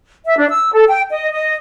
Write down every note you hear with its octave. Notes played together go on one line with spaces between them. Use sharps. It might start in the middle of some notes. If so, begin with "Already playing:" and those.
E5
D4
E6
A4
G5
D#5
D#5